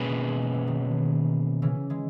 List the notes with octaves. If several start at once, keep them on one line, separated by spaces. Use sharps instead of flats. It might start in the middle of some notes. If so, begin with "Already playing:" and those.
Already playing: B2 A#3 C#4 G#4 B4
E3 G#3
G#3
F#3
E3
D#3 F#3
C#3 E3
E3 G#3